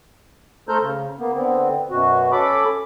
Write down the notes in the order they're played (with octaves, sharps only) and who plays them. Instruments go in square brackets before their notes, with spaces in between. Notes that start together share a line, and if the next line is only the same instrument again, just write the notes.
[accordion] A3 A4 C5 A#5 F6 G6
C#3
A#3 B3
D3 B3 C4
F#2 B2 F#4
C#4 A4 B5 D6